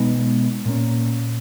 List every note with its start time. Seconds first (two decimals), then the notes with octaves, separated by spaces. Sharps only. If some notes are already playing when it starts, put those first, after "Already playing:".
Already playing: B2 G#3 B3 D#4
0.65 A#2 A#3 C#4